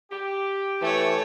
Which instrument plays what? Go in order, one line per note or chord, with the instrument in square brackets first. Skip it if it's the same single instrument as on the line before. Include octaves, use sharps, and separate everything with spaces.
[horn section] G4
[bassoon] E3 [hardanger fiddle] A3 C#5